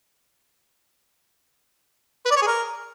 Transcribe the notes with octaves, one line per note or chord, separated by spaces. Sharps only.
B4
D5
C#5
G#4
A#4